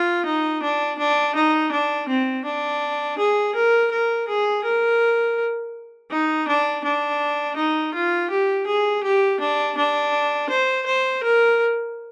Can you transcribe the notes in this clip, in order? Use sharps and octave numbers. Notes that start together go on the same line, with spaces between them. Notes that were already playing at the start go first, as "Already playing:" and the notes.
Already playing: F4
D#4
D4
D4
D#4
D4
C4
D4
G#4
A#4
A#4
G#4
A#4
D#4
D4
D4
D#4
F4
G4
G#4
G4
D4
D4
C5
C5
A#4